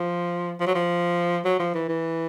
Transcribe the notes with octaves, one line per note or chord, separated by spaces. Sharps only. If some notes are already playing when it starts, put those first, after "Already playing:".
Already playing: F3
F3
F#3
F3
F#3
F3
E3
E3